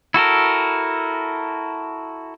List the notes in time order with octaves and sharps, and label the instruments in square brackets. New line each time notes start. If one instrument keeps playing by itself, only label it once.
[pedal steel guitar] E4 F#4 A4 A#4